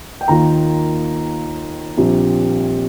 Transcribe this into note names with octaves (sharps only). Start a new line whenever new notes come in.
G5
D#2 D#3 A#3 F4 A#5
A#1 A#2 G3 C4